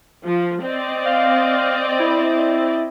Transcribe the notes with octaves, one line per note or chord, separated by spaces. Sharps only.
F3
C4 D5 D#5
F5
E4